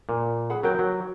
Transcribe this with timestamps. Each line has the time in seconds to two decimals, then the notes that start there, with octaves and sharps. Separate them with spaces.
0.09 A#2
0.50 G#4 F#5 B5
0.63 F#3 F#4 A#4 G5
0.79 F#3